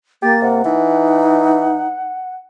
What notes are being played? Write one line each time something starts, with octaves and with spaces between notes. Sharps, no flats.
A#3 G4 A6
C3 F#5
E3 D#4